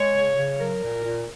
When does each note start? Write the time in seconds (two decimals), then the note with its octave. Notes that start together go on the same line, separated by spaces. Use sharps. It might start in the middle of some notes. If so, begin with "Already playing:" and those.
Already playing: G#3 C#5
0.15 C#3
0.36 C#3
0.59 F#3 A#4
0.82 A#2
1.04 A#2